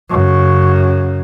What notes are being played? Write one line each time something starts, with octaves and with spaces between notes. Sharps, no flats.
F#2 C#3